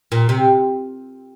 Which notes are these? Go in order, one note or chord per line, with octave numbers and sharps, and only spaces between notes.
A#2
C3